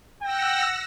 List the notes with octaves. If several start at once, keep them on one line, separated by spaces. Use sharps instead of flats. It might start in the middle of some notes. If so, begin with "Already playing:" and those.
F#5 G5 E6 A#6